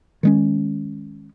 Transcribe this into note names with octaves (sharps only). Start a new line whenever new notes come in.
D#3 G#3 C#4